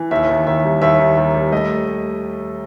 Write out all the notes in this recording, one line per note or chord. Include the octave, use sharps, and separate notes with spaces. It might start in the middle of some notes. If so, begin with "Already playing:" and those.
Already playing: E3
D#2 E5
D#3
D#2 E5
G3
D#2 E5
D#3
D#2
G3
A3 D#5